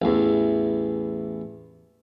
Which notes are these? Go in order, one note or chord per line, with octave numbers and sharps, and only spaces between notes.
A1 E2